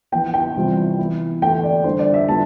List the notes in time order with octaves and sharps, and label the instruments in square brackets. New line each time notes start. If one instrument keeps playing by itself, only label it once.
[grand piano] F3 B3 E4 [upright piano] G5
[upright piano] G5
[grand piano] C3 E3 G3 C4 F4
E3 B3 E4
[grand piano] E3 A3 E4 [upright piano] G5
[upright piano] D5
[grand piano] D3 G3 D4 [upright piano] C5
[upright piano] D5
E5
[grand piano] D3 G3 B3 F4 [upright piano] A5